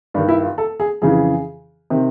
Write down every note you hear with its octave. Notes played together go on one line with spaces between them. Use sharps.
G2 D#3 D4
E4
F4
A4
G#4
F2 C#3 E3 G#4
C3 D#3